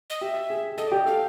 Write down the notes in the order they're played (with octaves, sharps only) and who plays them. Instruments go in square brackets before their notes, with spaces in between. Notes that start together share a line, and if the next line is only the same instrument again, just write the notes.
[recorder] D#5
[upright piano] G4 [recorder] E5
[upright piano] G#4
[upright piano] A4 [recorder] D#5
[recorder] D5
[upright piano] G4
[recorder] D#5
[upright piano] A4 [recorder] F5